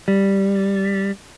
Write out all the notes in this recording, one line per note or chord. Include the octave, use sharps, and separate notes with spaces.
G3